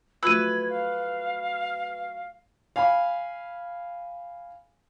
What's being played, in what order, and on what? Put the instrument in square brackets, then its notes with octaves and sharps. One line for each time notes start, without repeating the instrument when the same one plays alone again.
[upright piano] F3 F#3 A3 [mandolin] B4 [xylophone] E6 D#7 [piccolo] G#6
[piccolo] F5
[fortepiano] F5 G#5 B5